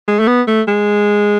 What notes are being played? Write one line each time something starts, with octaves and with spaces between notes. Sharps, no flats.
G#3
A3
B3
A3
G#3